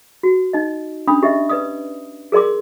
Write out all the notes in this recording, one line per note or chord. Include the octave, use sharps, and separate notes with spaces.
F#4
D#4 D#5
C#4 D4 B5 D#6
G4 D#5 E5
B4 D5 D#6
G#4 A#4 D5 C6 D6